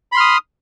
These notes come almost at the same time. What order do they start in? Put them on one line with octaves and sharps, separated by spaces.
B5 C6 F6 D#6